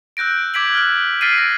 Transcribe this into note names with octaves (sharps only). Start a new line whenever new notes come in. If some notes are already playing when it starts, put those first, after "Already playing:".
E6 F#6 G6 A#6 D7
D6 G#6 B6 D7 F#7
F6 F#6
F6 A6 B6 C7 D7 D#7
A#6